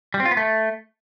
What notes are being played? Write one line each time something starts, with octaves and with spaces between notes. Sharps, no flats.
G3
C4
F4
B3
A3